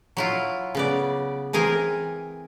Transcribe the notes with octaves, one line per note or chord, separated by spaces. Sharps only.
F#3 E4 F4
C#3 B3 D5
E3 C4 G#4 A#4